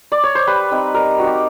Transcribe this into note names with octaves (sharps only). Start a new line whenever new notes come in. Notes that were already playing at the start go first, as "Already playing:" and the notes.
D5
C#5
C5
G3 B4
C4 D#4
G3 A#4
C4 D#4 F#4
G4